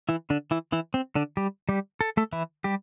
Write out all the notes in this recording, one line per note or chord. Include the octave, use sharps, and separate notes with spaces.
E3 E4
D3 D4
E3 E4
E3 E4
C4
D3 D4
G3 G4
G3 G4
A4
A3 A4
E3 E4
G3 G4